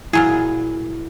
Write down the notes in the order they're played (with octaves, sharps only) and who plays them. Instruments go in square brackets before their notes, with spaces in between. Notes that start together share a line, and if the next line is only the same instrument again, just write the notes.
[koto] A#2 F#3 G#4 [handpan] E4